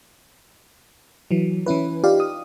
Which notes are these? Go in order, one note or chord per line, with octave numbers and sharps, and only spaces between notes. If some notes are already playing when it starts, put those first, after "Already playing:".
E3 F#3
E3 C#4 E4 B4
D#4 F4 G4 D5 F5
D#6